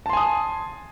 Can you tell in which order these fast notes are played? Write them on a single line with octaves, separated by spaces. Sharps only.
A5 C6 G#5 D#6